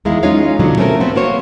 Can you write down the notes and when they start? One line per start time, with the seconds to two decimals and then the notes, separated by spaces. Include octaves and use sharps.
0.05 E2 D#3 G#3 E4 A#4 F5
0.23 G#3 C#4 D#4 F4 C#5 F5
0.59 B2 D3 F3 F#3
0.77 A3 C4 C#4 A4 A#4
1.00 A3 B3 C4
1.16 A#3 F#4 C5 C#5